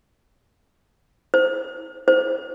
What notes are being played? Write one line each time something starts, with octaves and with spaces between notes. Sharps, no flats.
C5
C5